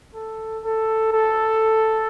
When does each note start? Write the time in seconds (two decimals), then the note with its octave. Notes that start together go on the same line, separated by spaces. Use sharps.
0.15 A4
0.64 A4
1.12 A4